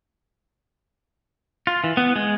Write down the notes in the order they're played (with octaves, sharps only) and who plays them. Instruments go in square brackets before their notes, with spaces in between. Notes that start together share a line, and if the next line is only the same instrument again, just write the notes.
[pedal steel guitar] F4
E3
B3
G#3